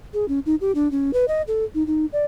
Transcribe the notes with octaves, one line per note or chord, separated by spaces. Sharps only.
G#4
C#4
D#4
G4
D4
C#4
B4
D#5
A4
D#4
D#4
D5